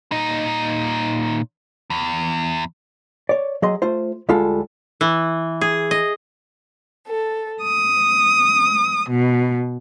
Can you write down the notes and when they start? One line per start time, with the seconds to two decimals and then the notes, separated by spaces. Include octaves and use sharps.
0.12 A#2 D#4
1.90 E2
3.29 C#5 D5
3.62 F#3 G#4 D#5 C6
3.82 A3 F4 C5
4.29 D2 G3 G#3 F4 A4
5.01 E3
5.61 G#4
5.91 D#5
7.06 A4
7.63 D#6
9.09 B2